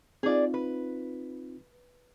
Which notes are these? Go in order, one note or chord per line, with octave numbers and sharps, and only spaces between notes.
C4 D#4 F4 G#4 D5
B4